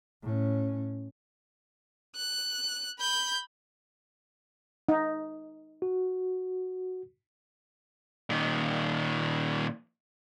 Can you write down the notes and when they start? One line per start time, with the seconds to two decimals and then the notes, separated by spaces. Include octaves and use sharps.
0.23 A2 C#4
2.16 F#6
2.99 B5 G6
4.89 D#4
5.82 F#4
8.30 A#2 D#3